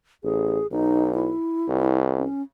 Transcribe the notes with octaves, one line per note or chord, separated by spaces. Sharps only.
A1 G#4
B1 D#4
E4
C2
C#4